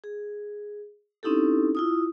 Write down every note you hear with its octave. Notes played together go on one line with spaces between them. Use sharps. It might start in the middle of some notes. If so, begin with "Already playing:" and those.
G#4
C4 C#4 D#4 E4 G4 A4
E4 F4 D#6